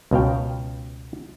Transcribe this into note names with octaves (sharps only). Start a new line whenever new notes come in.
C#2 B2 F5 G5